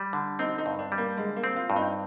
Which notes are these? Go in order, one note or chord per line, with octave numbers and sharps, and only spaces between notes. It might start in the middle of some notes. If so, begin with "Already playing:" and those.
Already playing: G3
D3
C4 D#4
D#4
G2
D4
G3
A#3
D3 G#3
A#3
C4
F4
G2
D#4